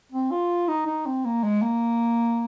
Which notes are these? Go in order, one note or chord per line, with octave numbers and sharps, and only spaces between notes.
C4
F4
D#4
D#4
C4
A#3
G#3
A#3